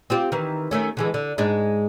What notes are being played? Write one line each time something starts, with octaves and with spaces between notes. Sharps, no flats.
C4 F4 G4
D#3 E3
D#3 A3 C#4
D3 E3 G#3
D3
G#2 G#3 D4